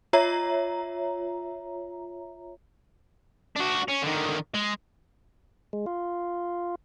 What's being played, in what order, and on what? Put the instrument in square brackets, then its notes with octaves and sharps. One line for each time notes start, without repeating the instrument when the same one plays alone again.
[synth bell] F4 C#5 E5 A#5
[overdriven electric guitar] D4 F#4
C#4
D3 D#3
G#3
[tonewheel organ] G#3
F4